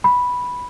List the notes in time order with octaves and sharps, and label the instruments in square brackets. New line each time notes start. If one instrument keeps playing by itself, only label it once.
[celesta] B5